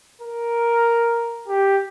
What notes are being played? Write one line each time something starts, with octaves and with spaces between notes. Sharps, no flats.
A#4
G4